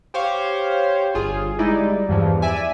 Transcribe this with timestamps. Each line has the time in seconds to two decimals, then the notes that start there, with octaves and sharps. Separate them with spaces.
0.14 G4 C5 C#5 F5
1.14 G1 F4 G#4
1.59 G3 G#3 D#4 E4 D5
2.08 E2 G2 E3 F3
2.42 D5 E5 G#5